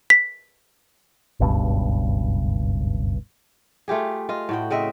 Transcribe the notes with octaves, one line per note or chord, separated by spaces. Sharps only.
B6
F#1 C#2 G2 B2
A3 F4 G4 G#4
F4 D#5
A2 F#4 G5
C#3 C4 D#5 E5